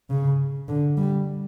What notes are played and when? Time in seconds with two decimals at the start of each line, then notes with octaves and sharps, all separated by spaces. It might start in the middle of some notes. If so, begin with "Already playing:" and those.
0.10 C#3
0.69 D3
0.97 G3